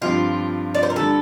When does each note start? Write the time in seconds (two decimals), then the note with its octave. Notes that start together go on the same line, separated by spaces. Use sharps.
0.01 G2 F3 C4 F4 G4
0.75 D5
0.83 C5
0.90 A#4
0.96 D3 G3 A4